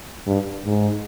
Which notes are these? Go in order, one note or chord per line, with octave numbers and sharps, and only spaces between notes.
G2
G#2